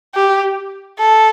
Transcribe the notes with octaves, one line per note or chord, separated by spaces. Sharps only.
G4
A4